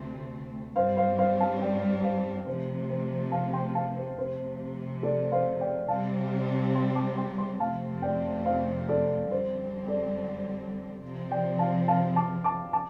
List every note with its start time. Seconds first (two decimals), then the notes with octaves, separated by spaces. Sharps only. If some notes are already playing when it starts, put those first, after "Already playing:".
Already playing: D2 C3 A3 C4
0.75 G2 G3 C4 C5 F5
0.97 C5 F5
1.18 C5 F5
1.40 F5 A5
1.61 D5 G5
2.03 C5 F5
2.46 C3 F3 A3 C5
2.89 C5
3.32 F5 A5
3.53 G5 C6
3.75 F5 A5
3.96 C5
4.18 F2 C3 A3 C5
5.03 A4 D5
5.32 C5 F5
5.60 D5 G5
5.88 C3 G3 C4 F5 A5
6.75 G5 C6
6.95 A5 D6
7.17 G5 C6
7.38 G5 C6
7.60 F2 C3 A3 C4 F5 A5
8.02 D5 G5
8.45 C5 F5
8.88 A4 D5
9.31 F2 D3 G3 C4 C5
9.88 A4 D5
11.03 C3 F3 C4
11.31 D5 G5
11.59 F5 A5
11.88 F5 A5
12.16 A5 D6
12.44 A5 D6
12.73 A5 D6